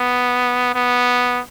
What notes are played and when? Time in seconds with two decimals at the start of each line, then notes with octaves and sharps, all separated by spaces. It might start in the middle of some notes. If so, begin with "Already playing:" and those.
Already playing: B3
0.75 B3